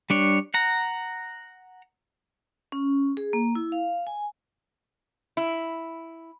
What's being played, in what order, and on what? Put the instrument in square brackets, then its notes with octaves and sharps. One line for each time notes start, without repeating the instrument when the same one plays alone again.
[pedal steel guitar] G3 D4 C#5
F#5 A#5
[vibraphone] C#4
G#4
A#3
E4
F5
G#5
[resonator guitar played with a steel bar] E4